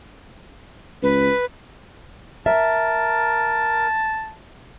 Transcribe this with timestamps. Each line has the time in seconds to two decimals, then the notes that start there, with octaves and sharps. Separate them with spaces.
1.03 C#2 B4
2.46 A#4 E5 A5